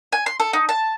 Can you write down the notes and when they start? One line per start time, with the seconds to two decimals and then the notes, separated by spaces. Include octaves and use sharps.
0.12 G#5
0.26 C6
0.40 A4
0.53 D#4
0.69 A5